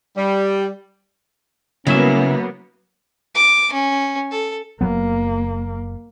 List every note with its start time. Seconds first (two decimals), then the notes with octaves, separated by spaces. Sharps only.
0.16 G3
1.87 C#3 F#3 A#3 B3 C#4 E4 E5
3.35 D6
3.73 C#4
4.31 A4
4.81 F#1 F#3 A#3 B3